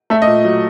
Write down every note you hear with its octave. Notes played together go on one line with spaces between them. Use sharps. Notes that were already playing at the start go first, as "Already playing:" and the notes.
A3 E5
D#5
A#2
F#3